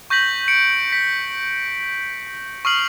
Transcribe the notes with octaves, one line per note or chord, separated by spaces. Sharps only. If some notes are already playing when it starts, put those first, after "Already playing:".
C#6 G6 A#6 B6 F#7
C#7 D7
B6
C#6 D#6 F6 C7 F#7